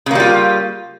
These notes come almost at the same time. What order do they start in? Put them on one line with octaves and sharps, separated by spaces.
C#3 A#3 G3 F4